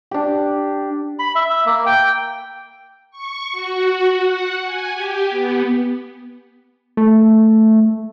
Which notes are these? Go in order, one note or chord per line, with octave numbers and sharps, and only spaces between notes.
D4 G4
B5
E5
A#3
G5
C#6
F#4
F#5
G#5
G4
B3
A3